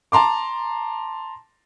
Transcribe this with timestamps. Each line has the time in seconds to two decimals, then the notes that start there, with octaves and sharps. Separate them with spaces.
0.12 A5 A#5 C6 D6